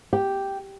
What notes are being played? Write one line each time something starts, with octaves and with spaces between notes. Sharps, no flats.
G4